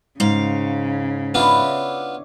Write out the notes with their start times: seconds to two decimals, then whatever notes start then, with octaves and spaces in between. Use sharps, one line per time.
0.20 G#2 C#3 F5
1.35 B3 D4 E4 F4 C#5